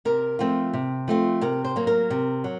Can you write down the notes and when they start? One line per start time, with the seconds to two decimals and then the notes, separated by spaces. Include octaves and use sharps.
0.05 C3 A#4
0.39 F3 A3 C4 F4
0.74 C3
1.08 F3 A3 C4 F4
1.41 C3 A#4
1.64 C5
1.76 F#3 A#3
1.87 A#4
2.10 C3
2.44 F#3